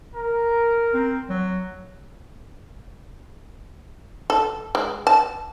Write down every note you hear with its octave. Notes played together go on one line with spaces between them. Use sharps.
A#4
C4
F#3
A4
G#3
A5